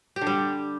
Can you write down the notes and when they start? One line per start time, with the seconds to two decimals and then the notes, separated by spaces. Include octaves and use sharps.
0.16 G4
0.21 D3
0.27 G3